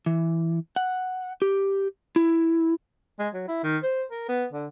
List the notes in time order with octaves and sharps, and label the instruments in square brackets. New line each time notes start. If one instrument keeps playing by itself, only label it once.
[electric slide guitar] E3
F#5
G4
E4
[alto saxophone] G#3
F#3
E4
D#3
C5
A#4
B3
D3